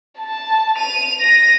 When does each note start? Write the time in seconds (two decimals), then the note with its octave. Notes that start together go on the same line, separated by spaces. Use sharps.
0.19 A5
0.77 D#7 F7
1.20 A#6 D#7